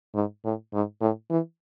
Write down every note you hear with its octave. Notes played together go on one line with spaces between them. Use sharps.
G#2
A2
G#2
A2
E3